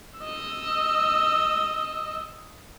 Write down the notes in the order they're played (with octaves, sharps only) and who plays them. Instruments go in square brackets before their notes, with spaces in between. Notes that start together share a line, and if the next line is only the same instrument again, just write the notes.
[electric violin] D#5 E6